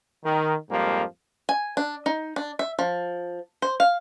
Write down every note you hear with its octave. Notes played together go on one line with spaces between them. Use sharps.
D#3
F2 G#2 F3 G3 A#3
G#5
D4
D#4
D4
E5
F3
C5
F5